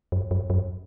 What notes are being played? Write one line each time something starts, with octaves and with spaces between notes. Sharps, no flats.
F#2
F#2
F#2